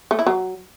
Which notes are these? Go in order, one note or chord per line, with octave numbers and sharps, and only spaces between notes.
A3
E4
F#3